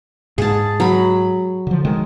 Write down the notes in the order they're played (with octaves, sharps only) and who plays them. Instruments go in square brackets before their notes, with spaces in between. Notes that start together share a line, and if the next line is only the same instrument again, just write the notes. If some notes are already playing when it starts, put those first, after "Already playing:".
[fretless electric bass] G#2 [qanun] G#4 A5
[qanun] F#3 B5
[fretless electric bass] D3 F3
D#3 G#3